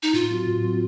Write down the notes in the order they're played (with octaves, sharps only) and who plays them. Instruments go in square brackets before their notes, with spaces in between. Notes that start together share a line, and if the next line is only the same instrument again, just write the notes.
[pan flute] D#4
[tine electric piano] A2 [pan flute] F4
[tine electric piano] F#3 C4 F#4
A2
F#3 C4 F#4